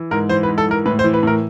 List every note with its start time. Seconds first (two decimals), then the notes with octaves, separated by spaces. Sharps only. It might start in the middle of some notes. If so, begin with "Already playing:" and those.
Already playing: E3
0.11 G#2 A#4
0.29 E3 C5
0.43 B4
0.48 G#2
0.58 A4
0.67 E3 A#4
0.86 A2 B4
0.99 C5
1.04 E3
1.14 B4
1.23 A2 A#4